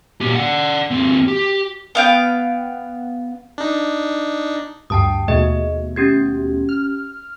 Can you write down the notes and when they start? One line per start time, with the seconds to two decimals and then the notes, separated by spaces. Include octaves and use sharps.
0.21 A#2 G4
0.35 D5 F#5
0.91 D#2 C4
1.28 G4
1.95 B3 F5 G5
3.58 D4 D#4
4.90 D2 G2 G5 A5 D#6
5.28 D#2 B2 A3 G#4 D#5
5.96 C#4 G4 G#6
6.69 F6